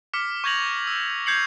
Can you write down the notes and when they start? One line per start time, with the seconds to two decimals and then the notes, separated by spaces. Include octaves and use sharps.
0.14 D6 F6 B6 C#7
0.44 C#6 G6 G#6 A#6 F7 F#7
0.87 E6
1.26 G6 G#6 C7 C#7 F7 F#7